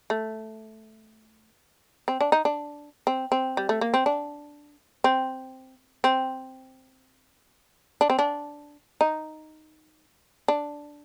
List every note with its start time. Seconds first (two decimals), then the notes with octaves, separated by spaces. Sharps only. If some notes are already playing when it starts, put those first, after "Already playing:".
0.10 A3
2.08 C4
2.21 D4
2.32 D#4
2.45 D4
3.07 C4
3.32 C4
3.57 G3
3.69 A3
3.81 A#3
3.94 C4
4.06 D4
5.04 C4
6.04 C4
8.01 D4
8.10 C4
8.19 D4
9.01 D#4
10.48 D4